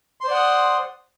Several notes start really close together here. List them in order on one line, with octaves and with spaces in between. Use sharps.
C6 C5 D5 F#5 D#6